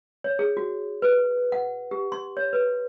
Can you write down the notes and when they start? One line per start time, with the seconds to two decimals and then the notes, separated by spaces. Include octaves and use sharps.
0.24 C#5
0.39 G#4
0.57 F#4
1.02 B4
1.52 F#5
1.91 G4
2.12 C6
2.37 C#5
2.53 B4